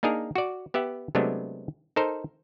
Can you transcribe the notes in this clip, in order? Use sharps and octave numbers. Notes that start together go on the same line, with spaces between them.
A#3 D4 D#4 G#4 A#4
F#4 D5
B3 G4 E5 F#5
C3 F#3 G#3 A3 B3 D4
D#4 A4 A#4 C5